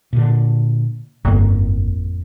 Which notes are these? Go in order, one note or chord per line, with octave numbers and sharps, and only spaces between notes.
A#2 D3
G1 F2 A2 A#3